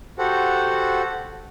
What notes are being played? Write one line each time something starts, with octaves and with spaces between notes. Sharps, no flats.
F#4 G4 A4 C5 F#5